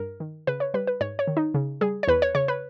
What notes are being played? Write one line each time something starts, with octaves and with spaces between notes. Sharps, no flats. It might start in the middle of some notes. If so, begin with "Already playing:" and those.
Already playing: G2 A#4
D#3
C#3 B4
C#5
G3 B4
B4
G#2 C#5
C#5
D#3
D#4
C#3
G3 G#4
C#5
E2 B4
C#5
C#3 C#5
B4